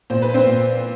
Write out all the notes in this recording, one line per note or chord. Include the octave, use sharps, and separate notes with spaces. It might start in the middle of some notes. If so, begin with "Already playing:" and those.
A#2 C5
B4
C4 C5
A#2